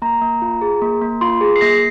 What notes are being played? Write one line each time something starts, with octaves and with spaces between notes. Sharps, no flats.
A#3 A#5
A#3
F4
G#4
A#3
A#3
F4 C6
G#4
C7
A#3 A#6